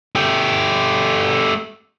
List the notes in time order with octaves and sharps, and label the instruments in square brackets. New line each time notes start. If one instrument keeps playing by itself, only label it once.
[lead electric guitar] A3 G4